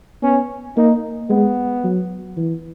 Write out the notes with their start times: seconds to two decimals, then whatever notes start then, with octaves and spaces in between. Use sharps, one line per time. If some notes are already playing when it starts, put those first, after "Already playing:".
0.23 B3 C#4
0.77 A#3 D#4
1.30 G#3 B3
1.84 F#3
2.37 E3